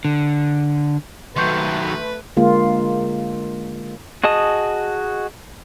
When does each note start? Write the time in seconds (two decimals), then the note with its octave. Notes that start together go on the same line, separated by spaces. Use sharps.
0.05 D3
1.36 D#3 F#3 A3 B4 C6 C#6 G6
2.36 D3 G#3 A#3 F4
4.24 F#4 G#4 D#5 A5 D#6